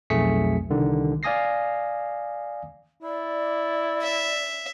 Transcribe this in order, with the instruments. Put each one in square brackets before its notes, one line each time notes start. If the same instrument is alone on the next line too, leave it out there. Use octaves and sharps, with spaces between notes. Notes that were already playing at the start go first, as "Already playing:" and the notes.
[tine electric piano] B1 F2 A3 G#4 B6 C#7
C2 D3 D#3
D5 F5 G#5 D#6 A#6 C7
[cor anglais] E4 [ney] D5
[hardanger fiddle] E5